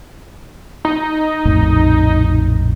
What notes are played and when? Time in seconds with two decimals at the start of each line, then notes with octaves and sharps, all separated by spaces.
0.85 D#4
1.45 A#1 F2 A2